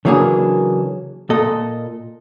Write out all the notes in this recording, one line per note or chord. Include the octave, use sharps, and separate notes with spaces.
C#3 E3 F#3 A#3 D4 G#4
A#2 A4 D#5